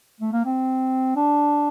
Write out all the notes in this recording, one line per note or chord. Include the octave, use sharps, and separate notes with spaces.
A3
A#3
C4
D4